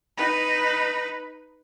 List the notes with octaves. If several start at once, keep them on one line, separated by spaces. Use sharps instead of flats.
D#4 B4